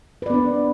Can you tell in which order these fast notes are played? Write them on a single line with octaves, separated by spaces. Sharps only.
B4 D5 B3 D4